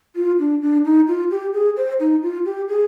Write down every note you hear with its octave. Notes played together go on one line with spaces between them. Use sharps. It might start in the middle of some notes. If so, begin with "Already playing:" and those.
F4
D4
D4
D#4
F4
G4
G#4
C5
D#4
F4
G4
G#4